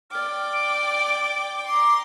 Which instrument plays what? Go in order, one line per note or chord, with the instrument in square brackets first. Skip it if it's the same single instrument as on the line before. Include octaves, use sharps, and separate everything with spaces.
[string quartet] D5 G5 D6 [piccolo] F6
[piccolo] D7
[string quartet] A#5 C6 [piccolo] D6